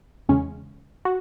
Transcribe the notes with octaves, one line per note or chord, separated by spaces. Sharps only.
E2 C#3 G#3 C#4
F#4